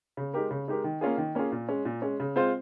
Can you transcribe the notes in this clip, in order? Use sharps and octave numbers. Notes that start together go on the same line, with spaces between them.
C#3
G#3 D#4 G4 A#4
C#3
G#3 D#4 G4 A#4
D#3
A#3 C#4 F4 G#4
D#3
A#3 C#4 F4 G#4
A#2
G#3 C#4
A#2
G#3 C#4
C#3
G#3 C4 F4 C5